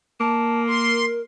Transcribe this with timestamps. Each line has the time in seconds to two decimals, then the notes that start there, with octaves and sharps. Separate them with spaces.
0.20 A#3 A5
0.67 A#4 C6